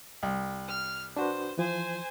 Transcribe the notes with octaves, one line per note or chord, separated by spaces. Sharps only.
C2
F6
D4 F#4 B4 C5
E3 F3 C5 G#5